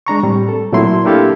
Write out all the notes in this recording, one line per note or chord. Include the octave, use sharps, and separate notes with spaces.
G#3 D4 A#5 C#6
A2 G3 C4
A4
A#2 F#3 A3 C4 E4 C6
A#3 D4 E4 G4 A4 F5